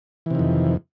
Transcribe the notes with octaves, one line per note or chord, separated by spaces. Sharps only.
F2 C3 D#3 E3